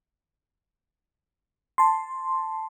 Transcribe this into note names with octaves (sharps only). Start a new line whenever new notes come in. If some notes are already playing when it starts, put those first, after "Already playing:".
A5 C6